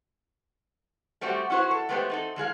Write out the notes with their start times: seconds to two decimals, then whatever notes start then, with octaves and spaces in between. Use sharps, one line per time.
1.21 G3 A3 C4 F#4 G4
1.50 C#4 E4 F#4 G#4 C5
1.71 A4
1.89 G#3 A3 B3 G4 G#4 C5
2.10 C4 D#4 A4
2.36 D3 G#3 G#4 F5